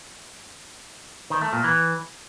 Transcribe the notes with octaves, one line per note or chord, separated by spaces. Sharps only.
D#3
A3
A#2
E3